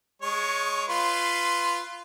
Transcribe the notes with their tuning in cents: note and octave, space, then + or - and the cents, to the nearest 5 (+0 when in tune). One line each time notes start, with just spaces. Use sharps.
G#3 +0 C#5 +10 C#6 -15
F4 -10 B4 +10 C6 +0